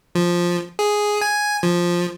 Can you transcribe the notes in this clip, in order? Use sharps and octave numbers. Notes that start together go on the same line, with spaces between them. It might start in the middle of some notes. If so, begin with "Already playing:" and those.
F3
G#4
G#5
F3